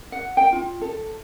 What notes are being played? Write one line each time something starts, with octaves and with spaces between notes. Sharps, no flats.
F#5
G5
F4
A4